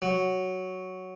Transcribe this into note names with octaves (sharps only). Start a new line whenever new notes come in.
F#3